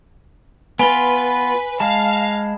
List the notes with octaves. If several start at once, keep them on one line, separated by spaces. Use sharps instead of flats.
B3 F4 B4 G#5 B5 G7
G#3 F5 A5